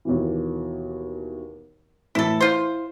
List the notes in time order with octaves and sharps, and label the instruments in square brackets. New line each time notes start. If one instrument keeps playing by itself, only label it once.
[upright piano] D#2 B2 E3
[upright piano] A2 E3 A3 [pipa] E4 A4
[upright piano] E4 [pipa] F4 C5